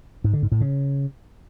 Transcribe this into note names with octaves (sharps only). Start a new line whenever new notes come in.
G#2
D3
G#2
A2
C#3